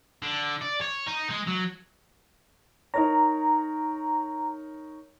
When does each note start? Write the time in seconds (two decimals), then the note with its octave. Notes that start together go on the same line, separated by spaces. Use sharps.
0.22 D3
0.61 D5
0.81 C#5
1.07 D#4
1.30 G#3
1.47 F#3
2.94 D#4 A#4 C#5 A#5